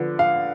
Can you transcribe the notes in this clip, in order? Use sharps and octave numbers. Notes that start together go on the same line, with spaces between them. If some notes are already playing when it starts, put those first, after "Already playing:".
Already playing: D3 F3 B3
F5